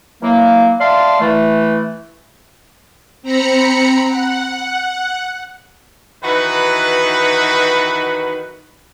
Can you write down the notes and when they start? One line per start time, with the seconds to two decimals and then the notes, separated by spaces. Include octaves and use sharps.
0.21 E3 F#3 A#3
0.80 D5 E5 F5 A5 C6
1.20 E3 A3
3.22 C4 A#5 B5 C#7
4.06 F#5
6.23 D#3 E3 D#4 F#4 B4